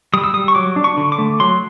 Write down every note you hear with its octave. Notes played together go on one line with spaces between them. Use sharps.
G3 D#6
E6
G3 D#6
C#6
F#3 D6
D4
C#6
D3
D6
A3
F#3 C6